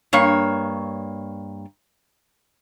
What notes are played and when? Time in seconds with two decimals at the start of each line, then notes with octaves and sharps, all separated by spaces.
0.13 G2 A#3 C#5